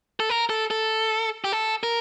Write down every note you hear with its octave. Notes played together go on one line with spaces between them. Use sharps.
A4
A#4
A4
A4
G4
A4
A#4